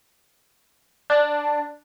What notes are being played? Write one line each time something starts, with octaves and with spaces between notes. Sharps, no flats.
D4